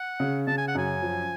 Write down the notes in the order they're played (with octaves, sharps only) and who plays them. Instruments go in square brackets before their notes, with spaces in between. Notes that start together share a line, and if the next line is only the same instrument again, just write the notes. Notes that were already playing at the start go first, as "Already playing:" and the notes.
Already playing: [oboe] F#5
[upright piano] C#3
[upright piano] C#3 [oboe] A5
[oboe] G#5
F#5
[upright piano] F#2 [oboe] G#5
[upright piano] F3